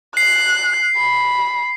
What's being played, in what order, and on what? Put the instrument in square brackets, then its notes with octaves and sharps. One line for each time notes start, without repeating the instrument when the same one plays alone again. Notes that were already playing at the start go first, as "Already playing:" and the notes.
[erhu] F#6 [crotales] C7
[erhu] B5